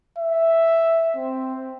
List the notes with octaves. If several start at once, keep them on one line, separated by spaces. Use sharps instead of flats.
E5
C4